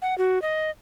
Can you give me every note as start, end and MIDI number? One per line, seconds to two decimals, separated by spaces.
0.02 0.17 78
0.18 0.41 66
0.42 0.71 75